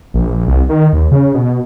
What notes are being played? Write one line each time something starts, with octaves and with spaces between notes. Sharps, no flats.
A#1
C2
D#3
D#2
C#3
B2